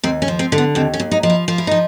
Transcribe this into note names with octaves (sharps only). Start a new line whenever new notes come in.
D#2 C4
C#4
F3
C4
D3
B3
D#2 C4
C#4
D#2
D#4
F3
E4
F3 F4
E4
F3 D#4